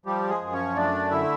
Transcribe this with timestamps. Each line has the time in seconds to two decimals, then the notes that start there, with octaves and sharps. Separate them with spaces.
0.06 F3 G3 G4
0.29 G#3 G#4
0.41 F#2
0.53 C#4 C#5
0.76 A3 D4 D5
1.11 D3 E4 E5